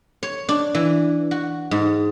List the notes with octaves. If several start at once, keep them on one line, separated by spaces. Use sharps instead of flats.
C#5
D4
E3
F#4
G#2